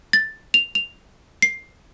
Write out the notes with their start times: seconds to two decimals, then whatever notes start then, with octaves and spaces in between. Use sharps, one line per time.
0.13 A6
0.54 F7
0.75 F7
1.42 C7